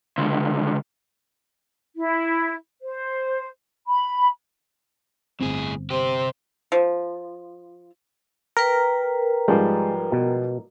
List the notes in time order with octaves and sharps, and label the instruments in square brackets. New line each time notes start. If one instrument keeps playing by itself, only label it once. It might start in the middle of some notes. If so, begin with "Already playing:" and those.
[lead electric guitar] C#2 D3
[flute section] E4
C5
B5
[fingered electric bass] G1 C4 [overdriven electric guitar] A2 G#4
[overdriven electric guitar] C3 G4 [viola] C5
[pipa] F3
[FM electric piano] A#4 [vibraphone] B4 G5 A#5
[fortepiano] G#2 F3 G3 [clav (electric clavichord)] G#3
[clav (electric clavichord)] B2